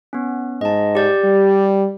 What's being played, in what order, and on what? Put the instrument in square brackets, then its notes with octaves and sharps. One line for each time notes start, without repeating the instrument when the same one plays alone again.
[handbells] B3 C#4
[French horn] G#2 [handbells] D#5 A5
[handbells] G4 D5 G6
[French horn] G3